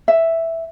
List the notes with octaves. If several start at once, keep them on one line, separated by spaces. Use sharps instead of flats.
E5